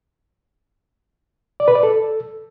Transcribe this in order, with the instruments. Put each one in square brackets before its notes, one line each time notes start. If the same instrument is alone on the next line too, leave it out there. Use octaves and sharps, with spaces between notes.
[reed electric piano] D5
B4
D5
A4